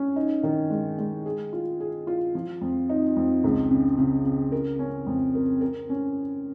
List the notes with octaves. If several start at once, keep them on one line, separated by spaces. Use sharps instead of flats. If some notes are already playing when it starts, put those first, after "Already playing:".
Already playing: C#4
D#4
D#3
G#3
G#3
G#4
F4
G#4
F4
F3
F2
D#4
F2
C#2
C#3
C#3
C#3
A#4
C#4
F2
A#4
A#4
C#4